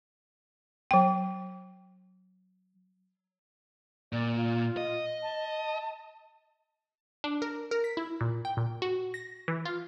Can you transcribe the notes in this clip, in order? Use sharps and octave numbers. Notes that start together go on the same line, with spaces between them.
F#3 G5
A#2 D5
F4
D#5
A5
D4
A#4
A#4
B6
E4
A#2
G5
A#2
F#4
A#6
E3
F4